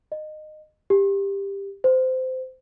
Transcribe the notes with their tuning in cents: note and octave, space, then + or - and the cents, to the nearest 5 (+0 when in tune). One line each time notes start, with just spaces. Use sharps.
D#5 -20
G4 +15
C5 -20